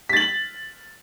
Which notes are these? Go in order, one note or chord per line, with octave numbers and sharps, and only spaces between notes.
A6 B6 F#7